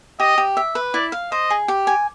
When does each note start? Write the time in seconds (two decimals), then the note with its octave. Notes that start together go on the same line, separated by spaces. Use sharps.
0.20 G4 D#5
0.38 G4
0.57 E5
0.75 B4
0.94 E4 D5
1.12 F5
1.32 C5 D#5
1.50 G#4
1.68 G4
1.87 G#5